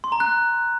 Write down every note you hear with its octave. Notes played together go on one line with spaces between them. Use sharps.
C6
A#5
F#6